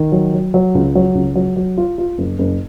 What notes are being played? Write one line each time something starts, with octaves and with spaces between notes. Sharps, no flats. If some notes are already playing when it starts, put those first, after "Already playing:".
Already playing: D#3
F#3
F#3
F#3
C#2
F#3
C#2
F#3
F#3
F4
F4
F#1
F#1